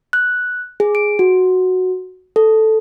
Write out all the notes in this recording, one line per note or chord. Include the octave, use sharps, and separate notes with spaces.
F#6
G#4
D7
F#4
A4